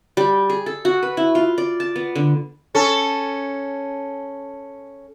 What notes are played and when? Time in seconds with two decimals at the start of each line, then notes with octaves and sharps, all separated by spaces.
0.17 G3
0.50 G#4
0.66 A4
0.85 F#4
1.03 B4
1.17 E4
1.35 F4
1.58 D5
1.80 A5
1.96 B3
2.15 D3
2.75 C#4 A4